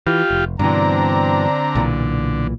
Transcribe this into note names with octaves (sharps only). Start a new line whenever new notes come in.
E3 F4 G4
F1
G2 B2 D3 E3 C4 D4 A#5
B1 A#2 E3